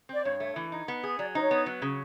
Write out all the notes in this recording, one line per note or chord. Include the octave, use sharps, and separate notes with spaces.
C4 D5
G2 C#5
A3
E3
D#4
B3
G#4
F#3 D5
D#4 C5
C#5
B3
F#3
C#3